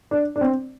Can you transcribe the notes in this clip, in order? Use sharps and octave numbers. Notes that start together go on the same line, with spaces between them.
D4
D4
C4